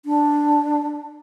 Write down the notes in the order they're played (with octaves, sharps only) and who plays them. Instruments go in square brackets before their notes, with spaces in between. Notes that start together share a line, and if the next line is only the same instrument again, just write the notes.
[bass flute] D4